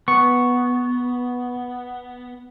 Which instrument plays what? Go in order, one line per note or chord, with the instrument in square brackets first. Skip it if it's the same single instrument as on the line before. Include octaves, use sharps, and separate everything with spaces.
[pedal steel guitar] B3 [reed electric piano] C#6